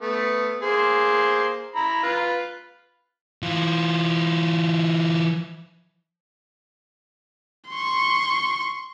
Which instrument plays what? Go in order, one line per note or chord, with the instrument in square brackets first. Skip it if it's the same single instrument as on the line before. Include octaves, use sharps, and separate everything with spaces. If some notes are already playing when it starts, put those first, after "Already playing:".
[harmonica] A3 B3
A#3 G#4 C5
E4 A#5 B5
F4 B4
[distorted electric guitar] E3 F4
[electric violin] C6 C#6